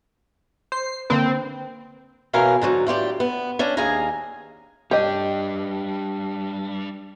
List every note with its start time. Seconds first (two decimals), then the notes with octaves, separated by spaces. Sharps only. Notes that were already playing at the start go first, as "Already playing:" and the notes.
0.72 C5 C7
1.10 D3 A#3 C4 B4
2.33 B2 E3 C#4 A#4 F5 G#5
2.62 G#2 D3 F#3
2.87 A2 F4 G4 D5
3.20 B3
3.59 C#4 D4
3.77 D#2 G#4 F5 G#5 A#5
4.91 G3 D4 G4 C#5 D#5